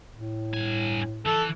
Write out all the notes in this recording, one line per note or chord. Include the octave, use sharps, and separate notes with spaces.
A2
G2 G#5
E3 A4